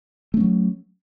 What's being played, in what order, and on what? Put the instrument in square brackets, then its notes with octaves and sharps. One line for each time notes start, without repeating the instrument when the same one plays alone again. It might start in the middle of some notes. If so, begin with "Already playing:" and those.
[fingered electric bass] A3
C#4
F#3